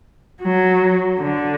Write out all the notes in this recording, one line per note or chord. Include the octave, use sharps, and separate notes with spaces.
F#3
D3